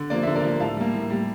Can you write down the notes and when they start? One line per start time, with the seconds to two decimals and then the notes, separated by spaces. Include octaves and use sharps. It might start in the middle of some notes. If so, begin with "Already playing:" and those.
Already playing: D3
0.10 F3 A#3 D5
0.23 D3 E5
0.35 A#4 D5
0.44 F3 A#3
0.60 A2 F5 A5
0.77 G3 A#3
0.94 A2
1.10 G3 A#3